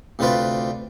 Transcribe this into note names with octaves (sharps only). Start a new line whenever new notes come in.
D2 C3 A3 F4 B4 D5